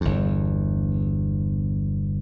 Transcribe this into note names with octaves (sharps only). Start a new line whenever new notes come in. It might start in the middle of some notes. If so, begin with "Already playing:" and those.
G1 E2